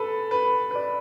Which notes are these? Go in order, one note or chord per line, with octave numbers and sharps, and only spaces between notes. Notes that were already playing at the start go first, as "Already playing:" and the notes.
Already playing: A4 B4
B4
B4
D5